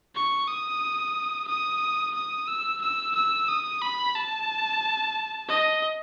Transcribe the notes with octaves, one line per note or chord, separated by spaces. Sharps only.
C#6
D#6
D#6
D#6
E6
E6
E6
D#6
B5
A5
D#5